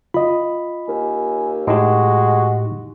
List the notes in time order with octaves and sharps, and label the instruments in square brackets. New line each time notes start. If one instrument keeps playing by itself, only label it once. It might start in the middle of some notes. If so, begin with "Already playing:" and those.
[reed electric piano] F4 D#5 [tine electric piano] B5
[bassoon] D#2 [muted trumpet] G#5
[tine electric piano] A2 D#4 G4 [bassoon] G#3 [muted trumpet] F#4